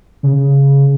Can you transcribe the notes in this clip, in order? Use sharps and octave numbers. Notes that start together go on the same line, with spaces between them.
C#3